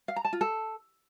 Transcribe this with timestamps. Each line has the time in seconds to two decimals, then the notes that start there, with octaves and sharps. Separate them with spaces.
0.08 F5
0.16 A#5
0.25 A5
0.33 F4
0.41 A4